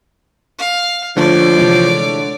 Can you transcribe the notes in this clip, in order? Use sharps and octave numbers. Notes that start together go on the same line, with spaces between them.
F5
D3 F3 A3 C#5 D5
C3 E3 G#3